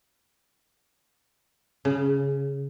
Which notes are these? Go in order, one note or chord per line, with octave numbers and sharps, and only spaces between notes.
C#3